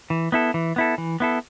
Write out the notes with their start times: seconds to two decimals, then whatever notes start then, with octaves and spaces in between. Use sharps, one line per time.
0.10 E3
0.32 B3 E4 A4
0.54 E3
0.76 B3 E4 A4
0.98 E3
1.20 B3 E4 A4